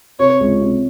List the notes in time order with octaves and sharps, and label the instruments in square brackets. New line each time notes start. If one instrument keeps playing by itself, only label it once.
[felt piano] C3 [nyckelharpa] C#5
[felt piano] C#2
C3